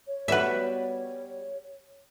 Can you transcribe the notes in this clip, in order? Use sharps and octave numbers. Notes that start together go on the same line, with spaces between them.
C#5
G3 B3 F#4 B4 E5